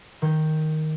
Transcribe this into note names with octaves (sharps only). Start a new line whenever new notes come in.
D#3 G6